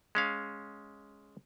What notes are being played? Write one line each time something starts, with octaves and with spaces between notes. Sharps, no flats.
G#3 C#4 F5